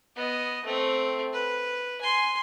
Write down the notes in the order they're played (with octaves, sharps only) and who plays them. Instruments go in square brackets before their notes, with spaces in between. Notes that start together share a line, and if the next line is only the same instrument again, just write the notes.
[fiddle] B3 D#5
A3 C4
B4
G#5 C6